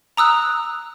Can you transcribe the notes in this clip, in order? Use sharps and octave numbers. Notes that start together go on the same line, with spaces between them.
A#5 D#6 E6 F#6